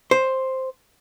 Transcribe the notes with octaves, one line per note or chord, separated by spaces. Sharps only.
C5